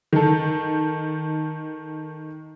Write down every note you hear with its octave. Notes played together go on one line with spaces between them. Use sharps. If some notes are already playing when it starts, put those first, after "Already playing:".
D#3 A4